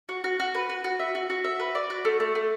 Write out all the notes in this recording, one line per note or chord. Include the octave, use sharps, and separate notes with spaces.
F#4
F#4
F#4
B4
F#4
F#4
E5
F#4
F#4
E5
B4
D5
F#4
A3
A3
A3